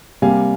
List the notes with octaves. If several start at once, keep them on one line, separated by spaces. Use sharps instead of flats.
C3 G3 A#3 F5 G#5